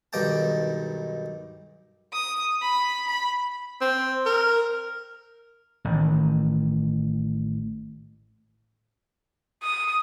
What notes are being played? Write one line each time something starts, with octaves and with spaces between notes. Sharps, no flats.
B1 G2 D#3 D#5 G5 A5
D#6
B5
B5
C4
A#4
A1 D#3
D#6